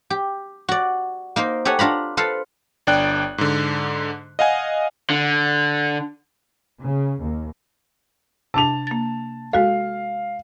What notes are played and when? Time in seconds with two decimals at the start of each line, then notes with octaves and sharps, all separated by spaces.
0.10 G4
0.69 F#4 D5
1.36 A#3 D#4 A#4 C5
1.65 G4 A4 C#5 F#5 G#5
1.79 D4 F4 A#5 B5
2.17 F4 A4 B4 C5 F5
2.87 G1 D4 D5 G5 F#6
3.38 G#2 D3
4.39 D#5 F5 F#5 G#5
5.10 D3
6.80 C#3
7.19 D#2
8.54 C3 D4 A5 F7
8.87 A#3 A6
9.53 G#3 F#4 A4 F5